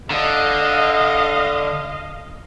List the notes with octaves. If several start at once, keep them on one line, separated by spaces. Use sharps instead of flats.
D3 D#5 F5